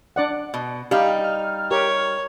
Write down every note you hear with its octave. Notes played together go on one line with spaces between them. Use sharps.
D4 D5 F#5
B2
G3 D#4 G4 F5
F6
G4 A#4 C#5